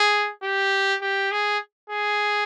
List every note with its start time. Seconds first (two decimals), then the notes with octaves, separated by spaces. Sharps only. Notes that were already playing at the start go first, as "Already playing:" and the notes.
Already playing: G#4
0.43 G4
1.02 G4
1.31 G#4
1.90 G#4